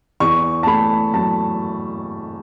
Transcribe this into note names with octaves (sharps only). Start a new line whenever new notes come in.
E2 C#6
A5
A3 B5
F#3 A5